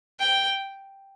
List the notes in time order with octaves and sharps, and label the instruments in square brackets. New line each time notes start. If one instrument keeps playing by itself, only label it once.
[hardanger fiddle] G5